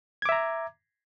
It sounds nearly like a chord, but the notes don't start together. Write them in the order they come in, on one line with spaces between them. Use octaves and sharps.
G#6 D6 E5 A#5